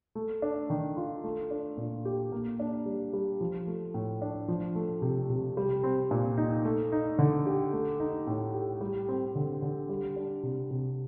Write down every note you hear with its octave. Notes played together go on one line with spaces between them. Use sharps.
A3
D4
D#3
F4
A3
D4
A#2
G4
A#3
D4
G3
G3
F3
A3
A2
D4
F3
A3
C3
C3
G3
C4
A#2
D#4
A3
D#4
D3
G4
A3
D#4
A2
G4
G3
C4
D3
D3
G3
D4
C3
C3